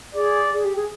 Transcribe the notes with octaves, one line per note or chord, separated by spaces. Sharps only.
G#4 D5
G#4
G4
G#4